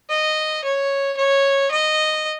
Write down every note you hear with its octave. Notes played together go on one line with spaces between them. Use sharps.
D#5
C#5
C#5
D#5